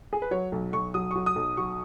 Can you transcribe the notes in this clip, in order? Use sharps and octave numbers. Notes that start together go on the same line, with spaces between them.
G#4
B4
F#3 C#5
B1
B1 C#6
F#3 D#6
F#3 C#6
D#6
B1
F#3 C#6